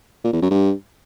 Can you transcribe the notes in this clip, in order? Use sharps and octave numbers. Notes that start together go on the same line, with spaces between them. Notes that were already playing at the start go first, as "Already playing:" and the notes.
A#2
E2
F#2
G2